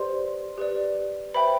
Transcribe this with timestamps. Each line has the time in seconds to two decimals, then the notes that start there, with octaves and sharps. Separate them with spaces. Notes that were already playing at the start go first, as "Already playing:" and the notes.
Already playing: G4 B4 C5 D5 C6
0.58 G4 B4 D5
1.34 B4 C5 E5 G5 B5